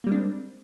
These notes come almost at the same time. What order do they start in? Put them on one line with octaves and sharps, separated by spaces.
A#3 G3 G#3 D4 C4